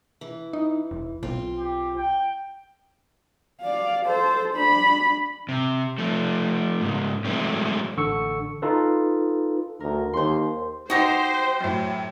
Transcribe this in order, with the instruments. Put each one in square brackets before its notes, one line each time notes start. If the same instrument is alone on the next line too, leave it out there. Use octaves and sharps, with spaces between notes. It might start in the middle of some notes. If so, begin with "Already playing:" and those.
[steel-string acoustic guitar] E3
[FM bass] D#4
E1
[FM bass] B1 [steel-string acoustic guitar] C4 F4
[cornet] G4
G5
[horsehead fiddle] D5 F5
A4 C5
D4 B5
[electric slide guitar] C3
F3 A3
G#2 C#3
E3 F#3 G#3 A3 C4 C#4
[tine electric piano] A1 D3 C#6 E6 C#7
D#4 F4 A4 B4
[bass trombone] D2 [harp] A#4
[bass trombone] D#2 [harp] C5 C6
[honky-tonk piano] D#4 A#6 [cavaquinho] F#4 G4 [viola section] C5
[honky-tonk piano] F#2 A2